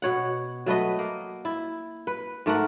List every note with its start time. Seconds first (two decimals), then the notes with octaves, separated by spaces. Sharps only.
0.02 B2 C#5 F#5
0.66 F#3 A3 B4 D#5
0.99 A#3
1.45 E4
2.07 B4
2.46 G#2 A3 A#4 F#5